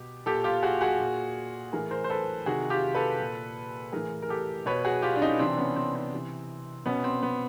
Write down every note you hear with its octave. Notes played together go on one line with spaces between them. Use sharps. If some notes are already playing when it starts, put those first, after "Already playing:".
Already playing: B2 G4
A#2 G4 A4
F4 G4
F#4 G#4
F#4 G#4
A#2
A2 E3 G#4 A#4
A#4 C5
C5
A4 B4
C3 D#3 F#4 G#4
F4 G4
A4 B4
A#2
A2 E3 G#4 A#4
A#4
G4 A4
B2 B4 C#5
F#4 G#4
F4 G4
D4
C#4 D#4
C3 E3 C4 D4
B3 C#4
C4
C4
C3 E3
B2 B3 C#4
C4
B3